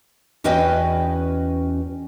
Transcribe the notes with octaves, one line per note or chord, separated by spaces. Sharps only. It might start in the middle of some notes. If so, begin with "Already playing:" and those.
E2 C#4 F#4 B4 D#5 G5